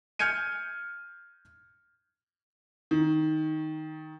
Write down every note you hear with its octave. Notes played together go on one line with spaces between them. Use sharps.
F6 G6 G#6 C#7 D#7
D#3